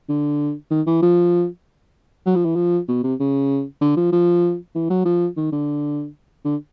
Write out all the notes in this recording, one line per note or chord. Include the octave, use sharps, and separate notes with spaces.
D3
D#3
E3
F3
F#3
F3
E3
F3
B2
C3
C#3
D3
F3
F3
E3
F#3
F3
D#3
D3
D3